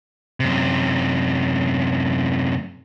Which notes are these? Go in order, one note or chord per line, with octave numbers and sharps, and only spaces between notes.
F#2 C3